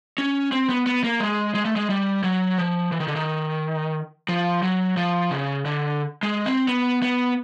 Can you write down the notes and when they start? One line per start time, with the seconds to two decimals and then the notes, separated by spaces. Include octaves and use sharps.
0.18 C#4
0.52 C4
0.69 B3
0.86 B3
1.04 A#3
1.20 G#3
1.55 G#3
1.65 A3
1.76 G#3
1.90 G3
2.24 F#3
2.58 F3
2.92 E3
3.00 D#3
3.08 D3
3.16 D#3
4.29 F3
4.63 F#3
4.97 F3
5.31 C#3
5.65 D3
6.23 G#3
6.46 C4
6.68 B3
7.02 B3